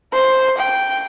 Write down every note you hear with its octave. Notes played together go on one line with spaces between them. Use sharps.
C5
G5